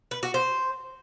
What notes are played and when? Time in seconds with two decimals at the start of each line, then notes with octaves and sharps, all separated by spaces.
0.11 B4
0.23 F#4
0.34 C5